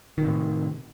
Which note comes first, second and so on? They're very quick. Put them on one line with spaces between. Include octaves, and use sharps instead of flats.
D#3 C3 A2